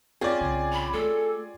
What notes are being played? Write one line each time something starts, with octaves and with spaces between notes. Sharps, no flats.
C4 C#4 F4 G#4 D5
C2 C#3
B5
A3 A4